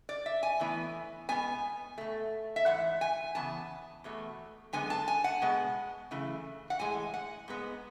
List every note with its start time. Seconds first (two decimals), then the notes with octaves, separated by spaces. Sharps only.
0.09 D5
0.26 E5
0.43 G#5
0.60 A2 E3 B3
1.29 B2 G#3 B3 G#5
1.98 B2 A3
2.56 E5
2.66 G#2 E3 F#5
3.01 G#5
3.35 C#3 E3 B3 A5
4.04 E2 B2 A3
4.73 F#2 D3 G#3 B3 G#5
4.90 A5
5.08 G#5
5.24 F#5
5.42 B2 G#3 B3
6.11 F#2 C#3 E3 A3
6.70 F#5
6.79 A2 E3 G#3 G#5
7.14 F#5
7.48 G#2 G#3 B3